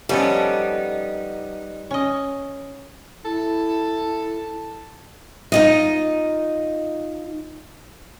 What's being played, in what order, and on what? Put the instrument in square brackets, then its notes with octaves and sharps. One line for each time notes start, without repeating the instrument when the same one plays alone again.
[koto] F3 C#4 A4 [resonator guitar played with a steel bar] G3 B3 [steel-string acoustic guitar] D#4
[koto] C#4 D#5
[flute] E4 [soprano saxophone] A4
[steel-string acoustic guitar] D#4 F4 D#5